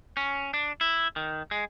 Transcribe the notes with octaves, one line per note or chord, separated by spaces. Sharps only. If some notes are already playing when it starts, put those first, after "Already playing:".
C#4
D4
E4
D#3
G#3